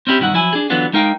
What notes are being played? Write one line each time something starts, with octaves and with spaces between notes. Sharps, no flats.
C4 C#4 E4 G4
B1 G2 D#3 E4 F#5
F3 F#3 E4 G#5
D4 G#4
D3 E3 F#3 B3 D4 F4
G#3 D#4 A#4 F5 G5